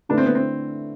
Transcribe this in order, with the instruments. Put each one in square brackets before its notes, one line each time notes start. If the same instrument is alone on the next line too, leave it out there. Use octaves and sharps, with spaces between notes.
[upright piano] D3 A3 E4 B4 [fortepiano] D4
[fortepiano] C4
B3
C4